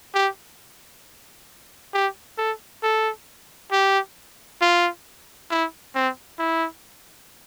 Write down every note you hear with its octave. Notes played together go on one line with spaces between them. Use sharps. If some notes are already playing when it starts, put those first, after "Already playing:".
G4
G4
A4
A4
G4
F4
E4
C4
E4